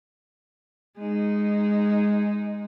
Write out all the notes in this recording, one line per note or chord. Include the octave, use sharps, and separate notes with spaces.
G#3 D#4